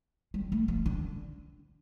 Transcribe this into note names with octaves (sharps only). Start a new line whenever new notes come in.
G3
A3
F3
D3